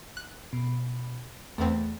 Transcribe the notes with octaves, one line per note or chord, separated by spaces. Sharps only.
F#6
B2
E2 A3 B3 C4